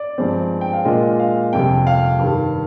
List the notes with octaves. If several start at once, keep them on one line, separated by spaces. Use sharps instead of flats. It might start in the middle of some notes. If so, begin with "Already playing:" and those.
Already playing: D5
G2 F3 G#3 C4
G5
F5
A#2 G#3 D4 F4 D#5
F5
F2 C3 G3 G5
F5
G2 D#3 G3